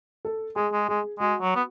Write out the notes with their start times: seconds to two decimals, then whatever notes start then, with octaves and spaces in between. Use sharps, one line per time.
0.25 A4
0.56 G#3 G#4
0.73 G#3
0.89 G#3 G#4
1.19 G#3 F#4
1.41 F#3
1.55 B3